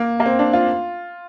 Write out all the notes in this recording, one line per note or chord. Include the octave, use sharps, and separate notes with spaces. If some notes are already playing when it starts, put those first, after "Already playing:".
Already playing: A#3
A#3
C4
D4
F4